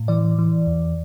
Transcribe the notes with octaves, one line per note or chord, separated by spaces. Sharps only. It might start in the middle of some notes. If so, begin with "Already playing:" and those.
Already playing: A2
E3 D5
E3
E2